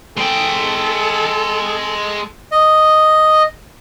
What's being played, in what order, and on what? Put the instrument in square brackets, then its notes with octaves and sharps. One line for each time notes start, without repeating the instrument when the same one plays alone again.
[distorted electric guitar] G#3 G5 [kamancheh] A4
[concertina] D#5